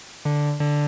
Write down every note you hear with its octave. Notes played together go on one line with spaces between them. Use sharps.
D3
D3